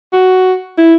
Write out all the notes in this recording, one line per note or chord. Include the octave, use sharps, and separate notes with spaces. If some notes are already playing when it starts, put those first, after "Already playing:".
F#4
E4